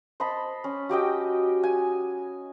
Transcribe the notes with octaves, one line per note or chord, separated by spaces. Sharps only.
C5 D#5 A5 B5
C#4
F#4 G4 D#5 G5
G#5